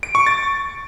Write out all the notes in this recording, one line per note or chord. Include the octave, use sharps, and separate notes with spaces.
D7
C#6
A6